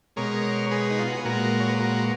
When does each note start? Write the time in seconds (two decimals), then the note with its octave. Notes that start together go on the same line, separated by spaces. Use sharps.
0.16 B2 G#3 A#4 C#5
0.71 G#4 B4
0.90 D#4
0.99 F4
1.07 F#4
1.16 G#4
1.25 A#2 G#3 F#4 A#4
1.60 C#5
1.69 B4
1.79 F#4 A#4